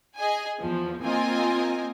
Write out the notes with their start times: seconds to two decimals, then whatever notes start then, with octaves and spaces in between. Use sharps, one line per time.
0.17 G#4 D#5 G#5
0.60 E2 F3
1.02 A#3 C4 F4 A#4 D#5 G#5